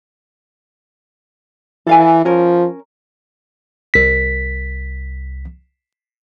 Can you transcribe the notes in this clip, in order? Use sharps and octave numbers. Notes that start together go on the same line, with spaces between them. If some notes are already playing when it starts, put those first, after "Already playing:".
E3 A4 F5 G#5
F3 C#4 A#4
C2 B6